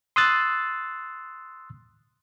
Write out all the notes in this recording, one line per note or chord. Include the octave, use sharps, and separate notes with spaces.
C6 D#6 E6 F#6 A6